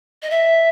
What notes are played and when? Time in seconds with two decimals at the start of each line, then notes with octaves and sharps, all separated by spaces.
0.23 D#5
0.30 E5